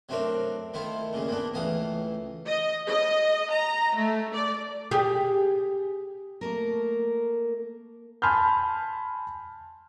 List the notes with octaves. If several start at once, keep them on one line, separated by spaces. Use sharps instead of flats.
F#3 A3 C4 D4 A#4 D5
D#3 A3 E4 F4
A#2 C#3 G#3
A#3 B3 D4
C#2 A2 E3 F5 D#6
D#5
D#5
A#5
A3
D5
G4 G#4
A3 A#3 A#4
G#5 A5 B5 C6 F6 G6